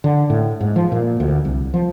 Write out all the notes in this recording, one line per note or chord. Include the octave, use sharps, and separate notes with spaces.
D3
A2
G#2
F3
A#2
D2
C2
F3